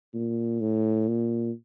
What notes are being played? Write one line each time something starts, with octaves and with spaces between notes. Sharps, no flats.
A#2
A2
A#2